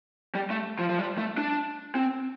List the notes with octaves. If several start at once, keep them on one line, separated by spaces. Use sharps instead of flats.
G3
A3
F3
F3
G3
A3
D4
C4